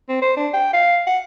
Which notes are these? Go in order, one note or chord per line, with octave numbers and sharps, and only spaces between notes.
C4
C5
D4
G5
F5
F#5